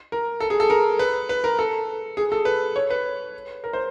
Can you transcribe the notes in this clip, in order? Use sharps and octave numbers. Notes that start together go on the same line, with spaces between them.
A#4
A4
G#4
A4
A#4
B4
B4
A#4
A4
G#4
A4
B4
C#5
B4
A#4
C5